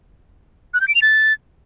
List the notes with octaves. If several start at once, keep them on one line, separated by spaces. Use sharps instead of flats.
F#6
G6
D7
F7
A6